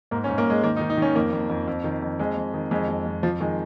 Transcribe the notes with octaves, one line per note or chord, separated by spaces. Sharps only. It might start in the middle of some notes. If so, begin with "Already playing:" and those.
G#2 A#3
C#4
G#2
A#3
G#2 G#3
D#3 A#3
D#4
D#3
D#4
D#3 C#4
F2 A#3
F2
F2
F2
D#3
F2
F2 G#3
F2
D#3
F2 G#3
F2
F2
F2 F3
D#3 G#3